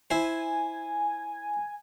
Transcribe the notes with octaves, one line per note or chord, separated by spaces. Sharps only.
E4 C5 G#5